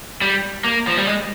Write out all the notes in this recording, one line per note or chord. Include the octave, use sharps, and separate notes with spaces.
G3
A#3
F3
G3
G#3